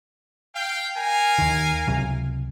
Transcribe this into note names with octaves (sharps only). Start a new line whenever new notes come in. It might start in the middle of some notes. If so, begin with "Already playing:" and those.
F5 G5
A#4 F5 G#5
D#2 D#3
C#2 C3 F#3